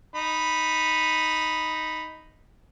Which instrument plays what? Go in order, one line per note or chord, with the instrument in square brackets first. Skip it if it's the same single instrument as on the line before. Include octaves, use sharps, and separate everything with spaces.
[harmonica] D#4 B5